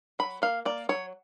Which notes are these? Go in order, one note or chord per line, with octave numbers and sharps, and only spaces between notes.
F#3 B5
A#3 F5
A#3 D5
F#3 C#5